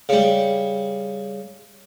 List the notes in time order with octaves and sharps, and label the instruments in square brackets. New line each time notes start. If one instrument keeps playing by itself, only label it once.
[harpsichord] C#3 G3